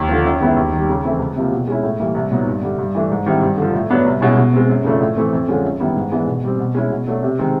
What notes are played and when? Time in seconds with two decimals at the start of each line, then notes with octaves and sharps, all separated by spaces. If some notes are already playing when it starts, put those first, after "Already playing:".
Already playing: D#2
0.09 D3 F3
0.25 F#2
0.40 D#3 G#3 B3 E4
0.56 D#2
0.72 D#3 G3
0.89 C#3
1.04 E3 A3 C4 E4
1.19 C#2
1.36 C3 F3 A#3
1.51 B2
1.68 G#3 C#4 E4
1.83 A2
2.00 E3 G3 A#3
2.14 C2
2.31 A#2 F#3 B3 D#4
2.47 G2
2.62 D3 G3
2.78 G2
2.95 E3 A3 D4
3.11 G#2
3.26 D#3 G3 C4 E4
3.41 G2
3.57 D3 F3
3.73 A2
3.90 F#3 B3 D4
4.06 C2
4.21 B2 G#3 C#4 E4
4.37 B2
4.53 G#3 C4
4.69 F#2
4.84 C#3 F3 A3 D4
5.01 A2
5.16 E3 A3 C4
5.33 F2
5.48 D3 F3 G#3 C#4
5.64 F#2
5.80 D#3 G3 B3 E4
5.96 G#2
6.12 E3 G#3 B3 D4
6.27 B2
6.44 G3 C4
6.59 B2
6.75 G#3 C#4 E4
6.91 B2
7.07 F#3 A3 D4
7.23 C3
7.39 D#3 G#3 C4